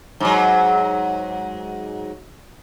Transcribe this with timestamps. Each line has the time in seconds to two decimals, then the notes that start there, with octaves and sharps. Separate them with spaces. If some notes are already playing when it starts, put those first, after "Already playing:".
0.20 G#2 F#3